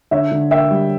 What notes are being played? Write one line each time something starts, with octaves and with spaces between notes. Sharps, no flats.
D3 C#5 E5
D3
A#3 E5 G5
G3